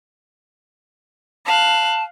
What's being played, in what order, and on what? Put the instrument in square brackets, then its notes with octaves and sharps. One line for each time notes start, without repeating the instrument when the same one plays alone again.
[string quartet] F5 F#6 [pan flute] A5